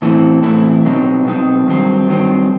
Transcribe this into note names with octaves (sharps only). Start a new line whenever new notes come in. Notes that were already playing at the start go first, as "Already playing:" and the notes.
A2 E3 A3 C4 E4
A2 E3 A3 C4 E4
B2 F#3 C4 D#4
B2 F#3 C4 D#4
G2 D#3 F#3 C4
G2 D#3 F#3 C4